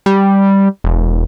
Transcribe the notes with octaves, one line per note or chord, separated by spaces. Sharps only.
G3
E1